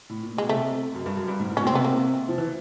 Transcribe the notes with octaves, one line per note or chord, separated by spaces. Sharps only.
A2
A#2
B2 G#3
C3 A3
F#2
G2
F#2
G2
G#2
A2
B2 C#4
A#2
C4
C3 B3
A#3
F3
E3